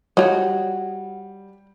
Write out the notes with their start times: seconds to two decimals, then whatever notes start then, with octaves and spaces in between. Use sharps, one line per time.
0.17 F3 G3 F#4 G4 C#5 D#5